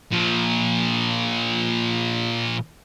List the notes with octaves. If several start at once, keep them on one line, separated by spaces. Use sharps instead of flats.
A#2 F3